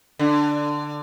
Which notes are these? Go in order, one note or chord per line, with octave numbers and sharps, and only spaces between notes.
D3